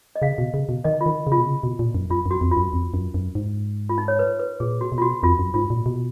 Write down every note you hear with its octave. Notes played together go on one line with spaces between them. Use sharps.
D#5
C#3 F5
B2
C#3
B2
D#3 D#5
F4
D#3
C#3
F4
B2
C#3
B2
A#2
F#2
F#2 F4
F#2 F#4
F2
F4
F#2
F2
F#2
F#2
G#2
F4
D#4
C#5
B4
B4
A#2 G#4
F#4
B2
F4
F#4
F2 F4
F#2
G#2 F4
A#2
B2